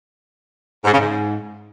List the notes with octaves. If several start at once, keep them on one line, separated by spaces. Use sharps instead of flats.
G#2
C#3
G#2